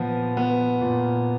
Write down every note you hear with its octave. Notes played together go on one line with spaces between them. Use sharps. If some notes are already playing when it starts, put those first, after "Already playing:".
Already playing: A#2 F3 B3
F3 B3
A#2